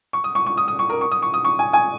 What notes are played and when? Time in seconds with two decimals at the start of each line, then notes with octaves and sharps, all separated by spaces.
0.13 C#6
0.24 D#6
0.35 C#6
0.46 C#6
0.57 D#6
0.68 D#6
0.79 C#6
0.89 A#4
1.01 C#6
1.12 D#6
1.22 C#6
1.34 D#6
1.45 C#6
1.59 G#5
1.73 G#5